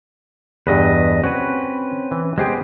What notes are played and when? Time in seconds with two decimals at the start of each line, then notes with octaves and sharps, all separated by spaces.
0.67 E2 G2 B4 D#5
1.24 C4 C#4 F#4 B4
2.11 E3
2.38 G#3 B3 G4 G#4 C5 G5